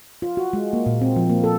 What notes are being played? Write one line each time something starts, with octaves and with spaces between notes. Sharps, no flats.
F4
F#4
G#3
A#3
A#2
C4
F3
A#3
A4